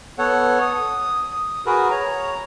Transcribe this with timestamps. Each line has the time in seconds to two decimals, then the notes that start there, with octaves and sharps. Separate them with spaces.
0.19 B3 A4 C#5 F#5
0.61 D#6
1.66 F#4 G#4 A#4 B4
1.91 C#5 A#5